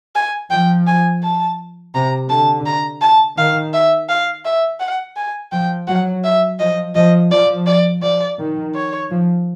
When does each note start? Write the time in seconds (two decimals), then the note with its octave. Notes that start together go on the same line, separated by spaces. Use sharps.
0.15 G#5
0.51 F3 G5
0.87 G#5
1.22 A5
1.95 C3 A#5
2.30 D3 A5
2.66 A#5
3.01 A5
3.37 D#3 F5
3.74 E5
4.09 F5
4.45 E5
4.80 F#5
5.17 G#5
5.52 F3 G5
5.87 F#3 F#5
6.24 E5
6.59 F3 D#5
6.95 F3 D#5
7.31 F3 D5
7.67 D5
8.02 F3 D5
8.39 D#3
8.75 C#5
9.11 F3